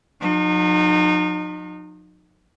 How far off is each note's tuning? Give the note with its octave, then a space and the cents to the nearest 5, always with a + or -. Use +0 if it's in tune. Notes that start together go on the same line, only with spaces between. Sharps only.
F3 +45 D#4 -30